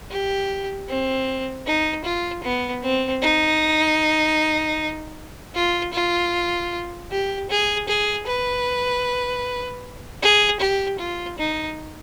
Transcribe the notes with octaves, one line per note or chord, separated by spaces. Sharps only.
G4
C4
D#4
F4
B3
C4
D#4
F4
F4
G4
G#4
G#4
B4
G#4
G4
F4
D#4